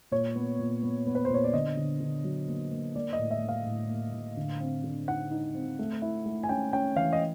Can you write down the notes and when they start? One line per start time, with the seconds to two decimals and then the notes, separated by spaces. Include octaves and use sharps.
0.12 A#2 C#5
0.35 B3
0.59 A#2
0.83 B3
1.07 B3
1.15 B4
1.25 C5
1.30 A#2 C#5
1.44 D5
1.53 D3 D#5
1.77 D3
2.00 D3
2.24 F#3
2.48 A#3
2.71 A#3
2.95 A#3 D5
3.13 D#5
3.19 A2
3.31 E5
3.42 A#3
3.49 F5
3.66 A2
3.89 A#3
4.13 A2
4.37 D3
4.60 C4
4.84 D3
5.08 D#4 F#5
5.31 D#4
5.55 C4
5.79 A3
6.02 E4
6.26 A3
6.44 G#5
6.49 C#4 G5
6.73 C#4 G5
6.96 E3 F5
7.13 D#5